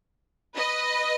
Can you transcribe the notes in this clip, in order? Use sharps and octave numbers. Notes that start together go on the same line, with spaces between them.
B4 D#5